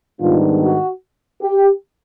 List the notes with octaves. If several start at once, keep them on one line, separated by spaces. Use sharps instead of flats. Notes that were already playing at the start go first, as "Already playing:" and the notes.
G#2 D#3 G3 B3 D4 F4
F#4
G4